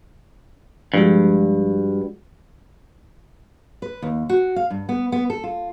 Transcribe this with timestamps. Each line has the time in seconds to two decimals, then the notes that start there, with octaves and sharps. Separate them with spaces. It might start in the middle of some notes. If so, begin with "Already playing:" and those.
0.94 G2 F3 G#3 F#4
3.82 B4
4.02 D#2
4.29 F#4
4.56 F5
4.70 G2
4.89 B3
5.12 B3
5.30 A4
5.44 F4